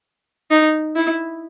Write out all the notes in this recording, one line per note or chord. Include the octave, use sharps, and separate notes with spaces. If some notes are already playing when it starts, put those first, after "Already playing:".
D#4
E4